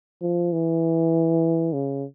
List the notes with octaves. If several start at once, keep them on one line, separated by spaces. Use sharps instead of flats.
F3
E3
C#3